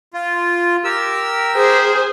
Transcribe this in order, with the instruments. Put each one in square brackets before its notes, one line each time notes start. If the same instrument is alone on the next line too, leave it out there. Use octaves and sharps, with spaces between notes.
[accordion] F4
G4 A#4 E6
[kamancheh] G#4 C5